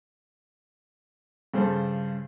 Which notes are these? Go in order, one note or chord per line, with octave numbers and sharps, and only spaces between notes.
G2 C#3 A4 C5